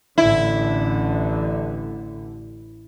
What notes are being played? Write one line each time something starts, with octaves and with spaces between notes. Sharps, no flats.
A1 D3 E4